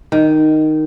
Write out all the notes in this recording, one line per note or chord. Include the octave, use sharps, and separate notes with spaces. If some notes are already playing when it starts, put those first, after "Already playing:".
D#3